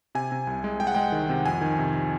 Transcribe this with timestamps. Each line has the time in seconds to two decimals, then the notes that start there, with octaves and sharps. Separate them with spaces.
0.15 C3 G#5
0.32 C3
0.47 C2
0.64 G#3
0.80 G#3 G5
0.87 F#5
0.95 G#3 G5
1.12 D#3
1.29 C3
1.45 F2 G#5
1.61 D#3
1.78 C3